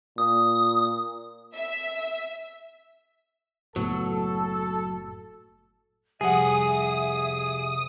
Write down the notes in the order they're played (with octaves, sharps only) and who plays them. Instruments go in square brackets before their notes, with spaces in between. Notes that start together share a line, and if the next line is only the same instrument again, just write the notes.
[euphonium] A#2 [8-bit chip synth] D#6
[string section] E5
[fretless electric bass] F#1 A2 B3 [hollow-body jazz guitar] F#3 [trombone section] A4
[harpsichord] C2 F2 F#5 [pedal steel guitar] G#4 [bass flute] E5 [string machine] D#6